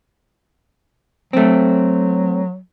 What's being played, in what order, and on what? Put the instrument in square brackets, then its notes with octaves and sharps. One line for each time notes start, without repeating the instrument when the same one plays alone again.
[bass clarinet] F#3 [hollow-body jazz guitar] A3 C4